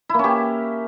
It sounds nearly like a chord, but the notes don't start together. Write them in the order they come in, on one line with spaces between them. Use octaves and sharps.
E4 A#3 C#4 G4